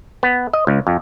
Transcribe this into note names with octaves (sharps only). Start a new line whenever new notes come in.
B3
D#5
C#2
F2